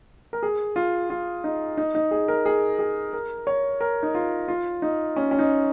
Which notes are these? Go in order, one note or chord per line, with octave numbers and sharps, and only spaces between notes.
A#4
G#4
F4
F4
D#4
D#4
D#4
G#4
A#4
G#4
G#4
A#4
C#5
A#4
D#4
F4
F4
D#4
C#4
C#4
D#4